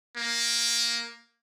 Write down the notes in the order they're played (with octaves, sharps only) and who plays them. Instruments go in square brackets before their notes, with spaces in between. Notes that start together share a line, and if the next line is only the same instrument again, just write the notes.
[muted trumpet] A#3